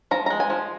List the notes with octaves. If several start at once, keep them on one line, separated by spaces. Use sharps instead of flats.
F3 A#5
G#3 A#5
G#5
F3